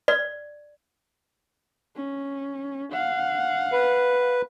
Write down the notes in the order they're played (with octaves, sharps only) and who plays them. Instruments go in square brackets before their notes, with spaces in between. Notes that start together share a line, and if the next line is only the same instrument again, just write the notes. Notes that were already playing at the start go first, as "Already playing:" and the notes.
[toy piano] D5
[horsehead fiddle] C#4
F5 F#5
[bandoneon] B4